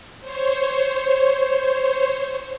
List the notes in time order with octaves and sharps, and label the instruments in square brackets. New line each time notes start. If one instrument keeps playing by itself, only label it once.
[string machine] C5 C#5